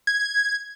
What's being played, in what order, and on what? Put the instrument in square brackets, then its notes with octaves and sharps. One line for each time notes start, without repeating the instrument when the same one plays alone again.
[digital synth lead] G#6